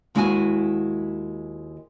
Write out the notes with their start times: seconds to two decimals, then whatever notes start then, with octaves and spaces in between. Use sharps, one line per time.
0.15 D#2 G#3 E4 F#4 G5 G#5